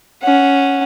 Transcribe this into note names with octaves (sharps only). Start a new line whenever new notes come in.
C#4 F#5